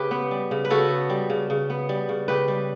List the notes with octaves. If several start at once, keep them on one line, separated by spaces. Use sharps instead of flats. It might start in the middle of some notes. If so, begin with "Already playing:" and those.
Already playing: C#3 G4 B4
B3
G3
C#3
B4
C#3 F#4 A4
B3
G3
C#3
C#3
B3
G3
C#3
C#3 G4 B4
G3